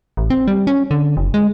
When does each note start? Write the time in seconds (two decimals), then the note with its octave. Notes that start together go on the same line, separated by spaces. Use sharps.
0.17 A1
0.30 C4
0.47 G3
0.67 C#4
0.91 D3
1.17 F#1
1.34 G#3